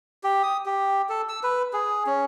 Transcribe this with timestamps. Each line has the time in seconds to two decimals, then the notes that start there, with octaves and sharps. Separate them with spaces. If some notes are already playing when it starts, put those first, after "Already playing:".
0.24 G4
0.43 D#6
0.66 G4
1.09 A4
1.29 E6
1.43 B4
1.73 G#4
2.06 C#4